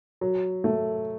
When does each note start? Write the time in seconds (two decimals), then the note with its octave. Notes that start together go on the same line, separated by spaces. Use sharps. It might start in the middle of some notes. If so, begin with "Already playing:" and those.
0.21 F#3
0.64 A3